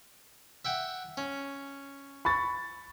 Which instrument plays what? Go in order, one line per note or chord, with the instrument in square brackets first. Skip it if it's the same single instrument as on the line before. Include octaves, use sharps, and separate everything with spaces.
[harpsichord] E5 F#5 G5
C#4
[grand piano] B5 C#6 A6